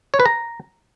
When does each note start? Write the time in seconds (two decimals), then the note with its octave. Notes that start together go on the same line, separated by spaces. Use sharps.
0.14 C#5
0.20 B4
0.26 A#5